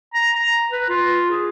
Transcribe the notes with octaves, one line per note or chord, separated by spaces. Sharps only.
A#5
A#5
B4
F4
G#4